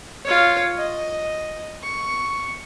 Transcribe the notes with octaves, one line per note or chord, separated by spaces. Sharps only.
F4 C#5
D#5
C#6